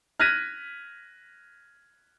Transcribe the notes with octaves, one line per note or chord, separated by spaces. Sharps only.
F6 F#6 G#6 A#6 B6 D#7